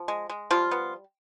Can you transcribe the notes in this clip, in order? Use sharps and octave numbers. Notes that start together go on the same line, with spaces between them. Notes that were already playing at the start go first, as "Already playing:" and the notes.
Already playing: F3
G#3
G#3
F3 G3 F4
B3